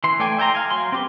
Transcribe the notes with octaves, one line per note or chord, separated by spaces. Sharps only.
E3 C6
A3 D5 G5 G#5
E5 G5 A5 A#5 C6
F5 G#5
F#3 C6
C4 G4 B4